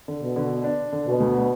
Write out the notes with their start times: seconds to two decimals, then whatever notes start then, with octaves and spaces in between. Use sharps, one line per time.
0.08 D3
0.22 B2
0.36 D3
0.64 D4
0.92 D3
1.06 B2
1.20 D2